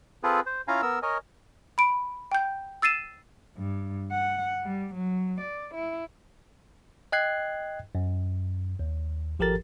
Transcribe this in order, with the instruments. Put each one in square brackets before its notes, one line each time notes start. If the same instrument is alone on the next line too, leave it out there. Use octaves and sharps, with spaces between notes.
[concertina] C4 F4 G#4 A4 B4
C5
C#4 E4 F4 F5 G#5 A#5
B3 A#4 E6
A#4 C#5 D#5 G#5
[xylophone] B5 D7
G5 G6
E6 A6 C7 D#7 E7
[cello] G2
F#5
G3
F#3
D5
E4
[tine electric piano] D#5 G5 F#6 G#6 C7
F#2
D#2
G#1 F3 G4 A4 A#4 A6